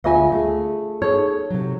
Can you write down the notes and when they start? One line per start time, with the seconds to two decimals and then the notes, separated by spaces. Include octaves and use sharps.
0.04 D2 G#3 F4 E5 F5 G#5
0.32 A3 G#4
1.02 D#4 G#4 A4 C#5
1.50 C3 F#3